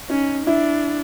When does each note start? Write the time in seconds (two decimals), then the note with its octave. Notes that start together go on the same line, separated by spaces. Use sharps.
0.10 C#4 D#4
0.46 D4 E4